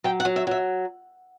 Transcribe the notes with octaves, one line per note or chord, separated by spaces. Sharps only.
F#3 G5
F#5
F#3
E5
F#3 E5